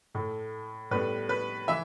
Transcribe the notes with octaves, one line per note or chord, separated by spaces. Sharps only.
A2 A3
A2 G3 B3 B4
B4
E3 E5